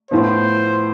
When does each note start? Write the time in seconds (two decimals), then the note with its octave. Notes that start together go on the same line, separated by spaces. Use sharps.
0.11 A2 F3 B3 C5